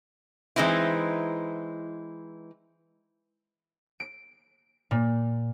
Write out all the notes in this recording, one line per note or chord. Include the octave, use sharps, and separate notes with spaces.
E3 G#3 C4 D#4 E4
D7
A#2